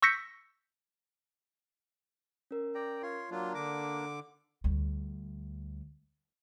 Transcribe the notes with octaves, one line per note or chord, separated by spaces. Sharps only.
C#6 E6 G6 A#6 B6 C#7
C#4 A#4
D5 G5 A#5
F4 C#5 C6
F#3 A#3 D4 F4
D3 D6 A#6
D2 G3